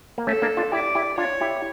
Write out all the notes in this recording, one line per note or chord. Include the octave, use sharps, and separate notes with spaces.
A#3
A3 C#4 A4
A#3 D4
D4 F4
E4 G4 D5
E4 G4
D4 F4 C#5
E4 G4